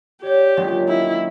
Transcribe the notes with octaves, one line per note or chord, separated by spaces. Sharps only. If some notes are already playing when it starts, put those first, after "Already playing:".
G4 C#5 D5 G6
A#2 D3 D#3 F#3 G#3 C#4
E4